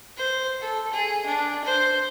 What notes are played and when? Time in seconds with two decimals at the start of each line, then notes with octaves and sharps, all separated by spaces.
0.17 C5
0.61 A4
0.93 G#4
1.26 D4
1.65 C5